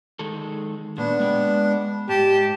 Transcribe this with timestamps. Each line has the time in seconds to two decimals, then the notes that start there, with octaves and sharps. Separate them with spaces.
0.19 D#3 G#3 A4
0.98 A#2 B3 D4
1.20 G#3 G5
2.09 G#2 G4 A5